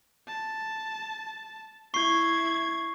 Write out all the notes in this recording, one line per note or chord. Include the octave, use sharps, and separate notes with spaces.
A5
E4 C#6 G#6 C7